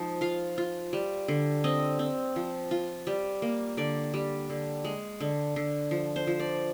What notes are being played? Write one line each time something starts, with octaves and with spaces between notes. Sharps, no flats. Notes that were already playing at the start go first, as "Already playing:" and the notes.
Already playing: F3 G#3 D#4
F4 F5
F4
G3
D3
C4 D#5
C4
F3
F4
G3
A#3
D3 D5
G3
D3
G#3
D3
D3
F3
C5
F3
D5